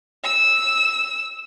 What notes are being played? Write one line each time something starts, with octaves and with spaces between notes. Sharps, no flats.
E6 E7